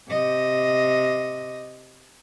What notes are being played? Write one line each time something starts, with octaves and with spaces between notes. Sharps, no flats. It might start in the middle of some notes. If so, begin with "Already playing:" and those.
C3 D#5